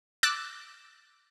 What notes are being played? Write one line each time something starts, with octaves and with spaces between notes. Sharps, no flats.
D6 E6 F#6 A6